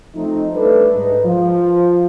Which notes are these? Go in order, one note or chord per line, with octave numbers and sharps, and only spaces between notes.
F3 A3 C4 D#4
G3 A3 D4 A4 B4
G#2 D#4 B4
F3